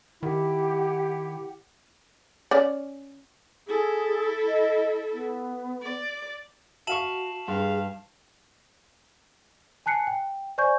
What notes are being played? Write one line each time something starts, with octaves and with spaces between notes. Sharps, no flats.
D#3 E4 G4 F#5
C#4 D5
E4 G#4 A4
D#5
B3
D5
F#4 E5 F5 A5 C#6 E7 F#7
G2 G#4 F5
G#5 A5 F#6 C7 C#7
G5
C5 D5 G#5 C#6 G6